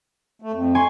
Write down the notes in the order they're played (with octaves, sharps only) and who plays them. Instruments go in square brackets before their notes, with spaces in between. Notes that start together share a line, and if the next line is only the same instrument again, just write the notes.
[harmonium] A3
F2
[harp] G#5 C6 C#6